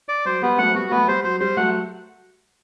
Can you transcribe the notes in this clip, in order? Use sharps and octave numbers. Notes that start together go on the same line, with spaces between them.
D5
F#3 C5
G3 B3
F#3 A3 F#5
C4
G3 B3 F#4
F#3 A3 B3
G3 C5
F#3 C5
G3 C5
F#3 A3 F#5